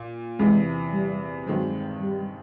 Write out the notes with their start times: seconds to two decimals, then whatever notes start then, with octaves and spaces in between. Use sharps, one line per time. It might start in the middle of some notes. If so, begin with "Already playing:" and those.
Already playing: A#2
0.39 E2 C3 E3 G#3
0.93 G3
1.47 G2 D#3 F#3 G#3 C4
2.01 G3